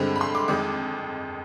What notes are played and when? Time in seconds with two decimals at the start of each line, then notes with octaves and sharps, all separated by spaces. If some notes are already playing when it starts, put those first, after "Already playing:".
Already playing: G2 D3 G#3 C4
0.16 B5
0.21 C6
0.35 D6
0.48 F2 D#3 G#3 D6